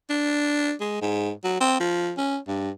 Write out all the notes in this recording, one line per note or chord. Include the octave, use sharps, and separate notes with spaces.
D4
G#3
G#2
F#3
C4
F3
C#4
G2